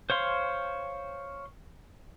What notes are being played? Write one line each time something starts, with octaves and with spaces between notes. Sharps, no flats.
C5 C#5 F5 C6